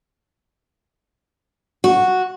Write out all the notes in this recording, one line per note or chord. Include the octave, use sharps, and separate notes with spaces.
F#4